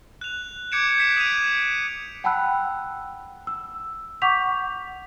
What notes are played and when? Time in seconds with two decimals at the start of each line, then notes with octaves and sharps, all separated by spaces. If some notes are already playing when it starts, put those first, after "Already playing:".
0.21 F#6 F7
0.72 D6 G6 G#6 C#7 D7 E7
0.98 G6 B6 E7
1.17 D#6 G#6 B6 D7 D#7 F7
2.24 F#5 G5 A5 B5 E6 F#6
3.47 E6
4.22 F#5 C#6 D6 G6 B6 F7